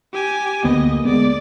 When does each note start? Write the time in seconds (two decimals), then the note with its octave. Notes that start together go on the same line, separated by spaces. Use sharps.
0.13 G4 G#5
0.64 D2 A#3 B3 D#5
1.05 G#3 B3 D5